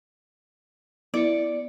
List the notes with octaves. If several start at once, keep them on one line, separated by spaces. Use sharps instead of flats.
B3 E4 D5 C#7